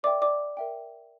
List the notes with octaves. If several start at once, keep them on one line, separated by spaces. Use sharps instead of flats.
A#4 D5 E5 G5 D6
D5 D6
A#4 E5 G5